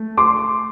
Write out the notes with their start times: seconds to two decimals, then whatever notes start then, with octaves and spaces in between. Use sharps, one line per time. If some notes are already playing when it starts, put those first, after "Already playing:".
Already playing: A3
0.18 C6 D6